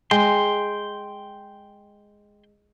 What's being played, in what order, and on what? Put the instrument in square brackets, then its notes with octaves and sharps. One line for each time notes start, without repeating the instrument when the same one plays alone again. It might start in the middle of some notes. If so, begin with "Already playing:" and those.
[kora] G#3 [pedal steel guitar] G5 C6